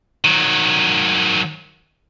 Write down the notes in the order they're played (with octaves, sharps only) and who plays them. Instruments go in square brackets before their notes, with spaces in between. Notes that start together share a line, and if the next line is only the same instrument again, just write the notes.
[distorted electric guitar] D#3 F#3